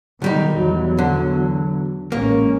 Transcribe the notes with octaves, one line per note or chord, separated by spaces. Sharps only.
B1 D#3 G3 D#4
E2 F#3
D3
A1 G#3 A#3 C#4